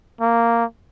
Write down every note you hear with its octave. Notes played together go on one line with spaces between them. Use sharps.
A#3